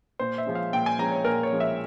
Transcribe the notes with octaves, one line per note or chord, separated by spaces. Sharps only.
A#2 C5
E5
F3 G#3 C#4
F5
A#2 G5
G#5
F3 G#3 C#4 A#5
C#5
A#2 A#4
C#5
F3 G#3 C#4
E5